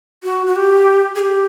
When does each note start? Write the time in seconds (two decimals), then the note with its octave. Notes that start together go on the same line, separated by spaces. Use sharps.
0.24 F#4
0.47 F#4
0.56 G4
1.15 G#4
1.20 G4